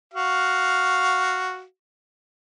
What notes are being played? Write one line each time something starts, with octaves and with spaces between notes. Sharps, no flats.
F#4 F5